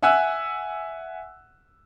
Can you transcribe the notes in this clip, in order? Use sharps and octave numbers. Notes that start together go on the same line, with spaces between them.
E5 F#5 G#5 E6 F#6